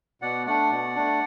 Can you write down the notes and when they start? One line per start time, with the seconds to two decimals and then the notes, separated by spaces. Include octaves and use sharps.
0.22 B2 D5 F#5
0.46 A3 D4 D5 F#5
0.71 B2
0.96 A3 D4